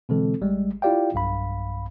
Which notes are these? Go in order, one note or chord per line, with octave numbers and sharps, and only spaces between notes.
B2 D3 E3 G#3 C4 A4
A1 G3 G#3
E4 F4 G4 D5 F5 G5
B1 G2 F5 B5